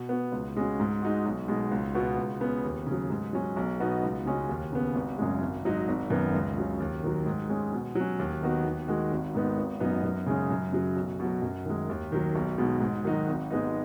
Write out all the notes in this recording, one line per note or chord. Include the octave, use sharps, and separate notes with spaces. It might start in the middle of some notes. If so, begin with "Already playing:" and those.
Already playing: B2
B3 F#4
C#2
C#3 G#3 C#4 F#4
G#2
G#3 D#4 F#4
B1
B2 G#3 D#4
C#2
B2 B3 F#4
C#2
C#3 B3
D#2
C#3 F#3
G#2
F#3 C#4
B1
B2 B3 D#4 F#4
C#2
C#3 G#3 C#4 F#4
D#2
C#3 B3
G#1
F#2 C#3 G#3
G#1
G#2 F#3 D#4
G#1
F#2 D#3 B3
C#2
C#3 F#3 C#4
D#2
D#3 F#3
G#2
G#3 C#4
B2
F#3
C#4
D#2
D#3 B3 D#4 F#4
D#2
D#3 G#3 D#4 F#4
G#1
G#2 D#3 B3 D#4
G#1
F#2 F#3 B3 D#4
F#2
C#3 G#3 C#4
F#2
C#3 F#3
B1
B2 F#3
F#2
D#3 G#3
D#2
D#3 F#3
B1
B2 G#3 D#4
G#2
D#3 F#3 D#4 F#4
G#1
G#2 G#3 B3 D#4